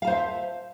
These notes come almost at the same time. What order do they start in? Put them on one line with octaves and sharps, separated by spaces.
F5 A5 C5 C#5 E5